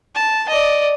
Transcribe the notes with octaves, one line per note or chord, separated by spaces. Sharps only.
A5
D5 D#5